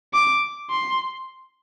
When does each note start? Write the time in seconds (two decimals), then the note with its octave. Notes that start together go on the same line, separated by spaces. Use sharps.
0.14 D6
0.70 C6